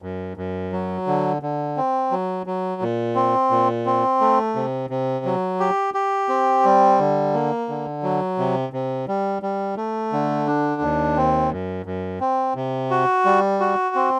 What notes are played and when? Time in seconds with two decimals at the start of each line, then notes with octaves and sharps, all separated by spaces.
0.02 F#2
0.37 F#2
0.72 F#3
1.07 D3
1.42 D3
1.77 C4
2.11 F#3
2.46 F#3
2.82 A#2
3.15 C4
3.51 A#2
3.86 C4
4.21 A3
4.55 C3
4.90 C3
5.25 F#3
5.60 G4
5.94 G4
6.29 C4
6.65 G3
6.99 D3
7.34 A#3
7.69 D3
8.03 F#3
8.38 C3
8.73 C3
9.08 G3
9.42 G3
9.77 A3
10.12 D3
10.47 D4
10.82 D#2
11.17 C4
11.52 F#2
11.86 F#2
12.20 C4
12.55 C3
12.90 F#4
13.25 G3
13.60 F#4
13.95 C4